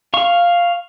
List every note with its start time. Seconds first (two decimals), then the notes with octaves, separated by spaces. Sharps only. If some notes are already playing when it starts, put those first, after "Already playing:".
0.14 F5 C#6